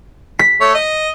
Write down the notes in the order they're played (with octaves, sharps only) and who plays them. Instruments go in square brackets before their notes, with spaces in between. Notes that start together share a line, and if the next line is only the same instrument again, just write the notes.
[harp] B6
[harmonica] A3 C#5
D#5